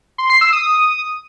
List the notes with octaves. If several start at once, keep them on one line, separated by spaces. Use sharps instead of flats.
C6
C7
E6
D#6